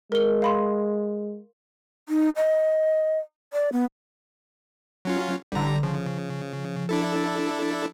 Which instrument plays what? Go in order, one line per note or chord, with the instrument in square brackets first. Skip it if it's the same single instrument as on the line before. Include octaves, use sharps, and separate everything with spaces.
[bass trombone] G#3 [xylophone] A#4 G7
[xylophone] F5 B5 C6
[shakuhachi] D#4
D#5
D5
B3
[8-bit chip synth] F#3 C#4 F4
[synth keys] A1 D3 [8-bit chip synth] G3 A#5
[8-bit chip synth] C#3 [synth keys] F3
[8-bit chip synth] D4 E4 A4